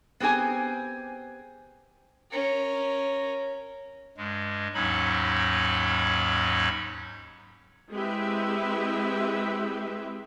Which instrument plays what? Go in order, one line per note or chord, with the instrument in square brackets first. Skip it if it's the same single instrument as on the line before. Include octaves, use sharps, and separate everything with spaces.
[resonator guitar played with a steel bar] B3 C4 G4 G#4 G#5
[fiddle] C#4 A#4
[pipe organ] G2 G#3
D#2 G#2 F#3 C#4 D#4 B5
[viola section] G#3 C4 E4 G4 B4 E5